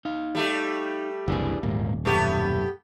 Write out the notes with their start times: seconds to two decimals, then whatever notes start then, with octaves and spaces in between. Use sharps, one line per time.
0.05 D#4 F5
0.35 G3 A3 G4
1.28 F#1 C2 E3 D4 G#4
1.63 D#1 E2 G#2 A#3
2.05 B1 F#2 A3 B3 G4